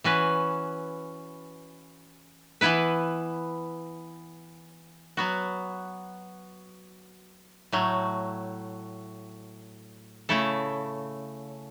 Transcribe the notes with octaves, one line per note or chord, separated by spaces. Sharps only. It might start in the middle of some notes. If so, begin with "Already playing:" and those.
E3 C#4 F#4 B4
E3 B3 E4 B4
F#3 B3 F#4
A2 F#3 A3
C#3 A3 E4 A4